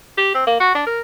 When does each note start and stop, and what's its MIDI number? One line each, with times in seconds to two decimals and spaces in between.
0.18 0.34 67
0.35 0.46 60
0.47 0.57 58
0.60 0.74 66
0.75 0.83 62
0.87 1.01 70